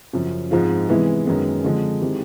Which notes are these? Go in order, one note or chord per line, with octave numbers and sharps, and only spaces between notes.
F#2 C#3 F3
G#2 F3 G#3 C4 F4
C3 E3 G#3 B3 E4
F#2 D#3 G#3 B3
D3 F3 G#3 C4
D#3 G#3 C4 E4 G4